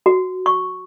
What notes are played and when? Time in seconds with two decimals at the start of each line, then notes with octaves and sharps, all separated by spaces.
0.06 F#4
0.46 C#6